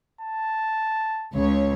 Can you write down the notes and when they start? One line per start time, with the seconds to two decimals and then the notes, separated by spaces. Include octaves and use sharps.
0.21 A5
1.35 C#2 C#5